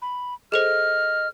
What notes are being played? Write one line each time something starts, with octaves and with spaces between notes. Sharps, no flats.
B5
G#4 A4 C5 D#5 F6